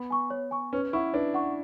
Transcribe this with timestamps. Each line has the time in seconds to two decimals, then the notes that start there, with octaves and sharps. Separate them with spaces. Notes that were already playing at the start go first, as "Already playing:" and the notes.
Already playing: B3
0.10 G#5 C#6
0.30 C#5
0.51 G#5 C#6
0.73 C#4 B4
0.93 E4 F#5 C#6
1.14 D4 B4
1.34 F#5 C#6